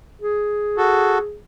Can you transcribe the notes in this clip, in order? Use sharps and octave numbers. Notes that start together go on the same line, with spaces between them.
G#4
F#4 A4